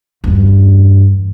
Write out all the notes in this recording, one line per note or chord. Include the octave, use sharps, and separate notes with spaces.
E2 G2